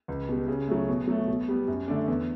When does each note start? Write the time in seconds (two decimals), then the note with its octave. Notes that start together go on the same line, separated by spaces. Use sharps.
0.08 C#2
0.29 B2 G3
0.48 C#3
0.68 F#3 A3
0.88 B2
1.07 F#3 A3
1.28 B2
1.49 G3 B3
1.68 F#2
1.88 D3 A3 D4
2.08 E2